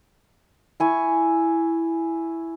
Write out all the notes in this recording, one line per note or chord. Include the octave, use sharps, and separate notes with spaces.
E4 G#5 C#6